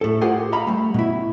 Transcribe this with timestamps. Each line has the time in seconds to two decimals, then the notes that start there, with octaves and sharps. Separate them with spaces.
0.01 A2 A4
0.21 F4 G4 G#4 A#4 C5 F#5
0.52 D#5 F5 A#5 B5
0.67 G3 A3
0.94 B2 E4